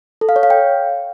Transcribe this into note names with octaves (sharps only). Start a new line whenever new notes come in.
A4
F5
C#5
F5
G5